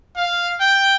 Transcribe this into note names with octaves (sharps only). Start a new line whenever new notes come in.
F5
G5